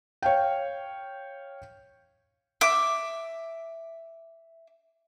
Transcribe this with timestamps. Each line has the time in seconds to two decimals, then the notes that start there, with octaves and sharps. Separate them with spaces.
0.22 C#5 F5 G5
2.61 E5 D6